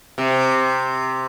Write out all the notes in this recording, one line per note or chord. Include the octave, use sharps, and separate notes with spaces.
C3